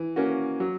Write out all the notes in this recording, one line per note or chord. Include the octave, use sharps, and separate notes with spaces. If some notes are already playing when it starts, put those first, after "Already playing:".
Already playing: E3
A#3 C#4 F#4
F#3